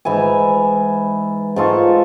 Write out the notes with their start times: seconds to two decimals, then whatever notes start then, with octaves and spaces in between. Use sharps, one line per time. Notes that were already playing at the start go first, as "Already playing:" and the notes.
0.05 G#2 E3 E5 G#5
1.56 G#2 F4 A4 C#6